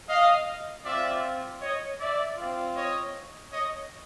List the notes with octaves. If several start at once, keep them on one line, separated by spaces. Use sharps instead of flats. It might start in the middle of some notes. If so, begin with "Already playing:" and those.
D#5 F5
C4 F4 D5 E5
C#5 D#5
D5 E5
C4 F4
C#5 D#5
C#5 D#5